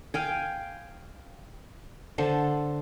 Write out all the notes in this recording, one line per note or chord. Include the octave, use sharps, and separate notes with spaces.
F5 G5 G#5
D3 C5 A5